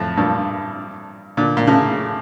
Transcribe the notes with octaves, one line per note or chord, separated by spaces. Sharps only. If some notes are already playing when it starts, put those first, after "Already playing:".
Already playing: F2 A2
G2 A#2
A#2 D3
A#2
A2 C#3